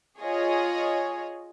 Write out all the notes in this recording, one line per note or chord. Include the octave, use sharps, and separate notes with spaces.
F4 G#4 C#5 D#5